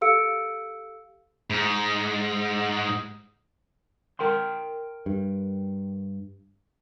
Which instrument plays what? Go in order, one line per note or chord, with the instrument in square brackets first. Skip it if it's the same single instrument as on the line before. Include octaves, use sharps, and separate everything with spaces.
[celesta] G4 A4 F5 E6 C#7 D7
[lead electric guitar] G#2
[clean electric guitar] A#4 G5 C6
[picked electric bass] G2